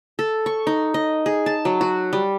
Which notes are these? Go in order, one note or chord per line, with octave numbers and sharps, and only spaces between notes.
A4
C#6
D#4
D#5
G#4
A5
F#3
F#4
G3